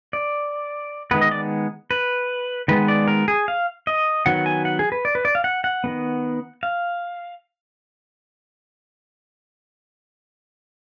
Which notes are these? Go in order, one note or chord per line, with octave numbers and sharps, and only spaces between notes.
D5
D#3 G#3 B3 B4
D#5
D5
B4
D#3 G#3 B3 B4
D5
A#4
G#4
F5
D#5
D#3 F#3 B3 F#5
G#5
F#5
G#4
B4
D5
B4
D5
F5
F#5
F#5
D#3 G#3 B3
F5